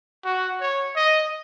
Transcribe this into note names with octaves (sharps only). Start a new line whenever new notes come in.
F#4
C#5
D#5